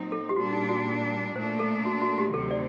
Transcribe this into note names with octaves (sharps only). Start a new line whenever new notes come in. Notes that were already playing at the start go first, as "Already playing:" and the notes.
Already playing: A#2 F#3 C4 D#4
A4
G4
A#2 G3 D4 F#4
D#4
F#4
A#2 A3 D4 C5
A4
F#4
F#4
G4
D2 C3 D#3 F#3 C4 A4
D5